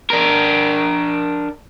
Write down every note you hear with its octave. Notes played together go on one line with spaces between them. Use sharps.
D4 A#4